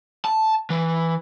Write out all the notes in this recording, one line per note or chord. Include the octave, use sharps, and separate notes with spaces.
A5
E3